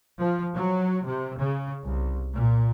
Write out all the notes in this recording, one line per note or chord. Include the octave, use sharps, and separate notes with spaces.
F3
F#3
C3
C#3
C2
A#2